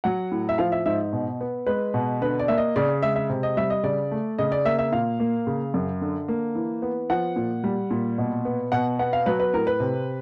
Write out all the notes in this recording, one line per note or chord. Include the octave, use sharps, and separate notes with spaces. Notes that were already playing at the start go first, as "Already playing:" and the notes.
F#3 F#5
A2
E5
F3 F5
E5
G#2 E5
B2
B3
G#3 B4
B2
D3 B4
D5
A#3 E5
D#5
C#3 D5
G#3 E5
E5
C3
D#5
G3 E5
D#5
C#3 D5
A3
C#3 D#5
D5
A#3 E5
E5
A#2 F5
A#3
C#3
F#2
D3
A#3
E3
B3
F3 F#5
A#2
G3
A#2
B2
B3
B2 F#5
B3 F#5
F5
F#3 B4
B4
A2 A#4
B4
C3